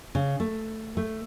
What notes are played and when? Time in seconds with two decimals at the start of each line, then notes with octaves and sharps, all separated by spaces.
0.15 C#3
0.40 A3
0.97 A3